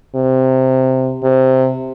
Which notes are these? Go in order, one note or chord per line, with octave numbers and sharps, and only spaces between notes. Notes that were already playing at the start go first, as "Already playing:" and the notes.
C3
C3